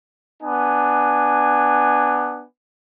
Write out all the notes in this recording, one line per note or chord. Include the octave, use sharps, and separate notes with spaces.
B3 D4 G#5